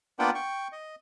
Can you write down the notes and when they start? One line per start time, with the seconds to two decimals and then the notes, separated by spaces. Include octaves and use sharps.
0.19 A#3 B3 D4 F4 F#5 G5
0.35 G5 C#6
0.72 D#5